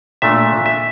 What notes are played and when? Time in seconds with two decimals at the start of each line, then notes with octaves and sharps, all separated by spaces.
0.22 A#2 A3 D4 E5
0.66 E5